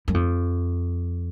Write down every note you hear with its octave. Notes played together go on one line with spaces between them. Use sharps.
F#2
F2